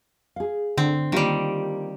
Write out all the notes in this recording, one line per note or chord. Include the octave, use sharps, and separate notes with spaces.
G#4 F5
D3 C4
D#3 G3 A#3 F4 G4